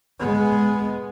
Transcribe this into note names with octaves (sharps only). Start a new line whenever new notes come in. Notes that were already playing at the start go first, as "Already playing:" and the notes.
G#3 B3